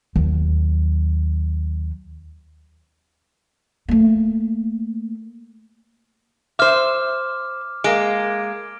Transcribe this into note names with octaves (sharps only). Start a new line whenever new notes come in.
D#2 F#3
A3 A#3
C5 E5 D6 F6
G#3 A#3 D7